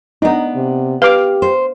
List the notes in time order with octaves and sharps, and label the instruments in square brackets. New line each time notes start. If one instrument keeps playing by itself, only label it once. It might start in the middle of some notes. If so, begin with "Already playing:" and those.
[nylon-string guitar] B3 D4 [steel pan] D#4
[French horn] C3
[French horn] G4 [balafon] B4 [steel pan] F5 D6
[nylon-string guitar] C5